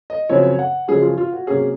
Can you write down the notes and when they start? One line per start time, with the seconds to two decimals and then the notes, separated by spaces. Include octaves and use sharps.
0.10 D#5
0.29 F#2 C#3 F3 C4 C#5
0.59 F#5
0.88 F#2 C#3 F3 G#3 G#4
1.02 F4
1.17 F4
1.33 F#4
1.47 C3 F#3 A#3 C#4 G#4